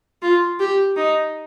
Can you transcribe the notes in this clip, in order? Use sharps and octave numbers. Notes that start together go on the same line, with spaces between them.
F4
G4
D#4